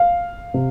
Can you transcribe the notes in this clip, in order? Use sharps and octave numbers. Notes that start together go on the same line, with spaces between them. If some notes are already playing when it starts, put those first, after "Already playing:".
Already playing: F5
C3